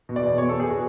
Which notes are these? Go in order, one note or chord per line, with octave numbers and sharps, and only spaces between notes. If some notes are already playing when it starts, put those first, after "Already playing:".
B2
D5
E2
E2 C#5
E2 A4
G#4
B2 F#4